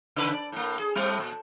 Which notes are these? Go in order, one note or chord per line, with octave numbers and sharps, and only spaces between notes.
C#3 B4
D5
A2 A#3
G#4
A2 G3 C4
A#2